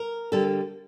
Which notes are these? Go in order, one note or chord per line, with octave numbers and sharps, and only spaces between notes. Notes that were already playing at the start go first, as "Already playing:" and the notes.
Already playing: A#4
D3 G3 A#3 A4